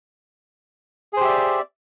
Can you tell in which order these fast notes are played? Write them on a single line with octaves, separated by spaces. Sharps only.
G#4 C5 G4 E5 D5